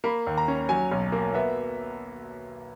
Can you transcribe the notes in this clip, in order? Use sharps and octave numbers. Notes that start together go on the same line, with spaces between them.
A#3 B5
D#2
A#5
C#4
F#3 G#5
B1
A#3
B3 E5